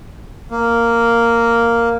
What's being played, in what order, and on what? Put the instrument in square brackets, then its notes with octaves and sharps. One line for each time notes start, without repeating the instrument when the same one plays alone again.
[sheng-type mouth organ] A#3